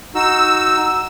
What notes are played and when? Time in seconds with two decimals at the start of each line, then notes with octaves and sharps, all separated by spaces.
0.15 D#4 F#4 E6